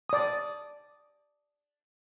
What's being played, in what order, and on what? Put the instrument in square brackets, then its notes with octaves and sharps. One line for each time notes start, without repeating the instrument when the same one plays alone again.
[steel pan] D5 D#6